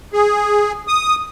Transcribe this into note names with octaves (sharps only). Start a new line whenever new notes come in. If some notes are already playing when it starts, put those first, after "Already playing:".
G#4
D#6